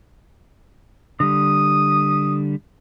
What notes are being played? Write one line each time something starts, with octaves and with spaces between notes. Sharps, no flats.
D3 G3 D#6